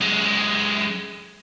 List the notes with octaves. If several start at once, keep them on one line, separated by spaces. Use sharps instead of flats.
F#2 G#3